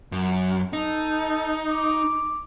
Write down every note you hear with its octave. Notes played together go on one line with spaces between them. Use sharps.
F#2
D#4 A4
D6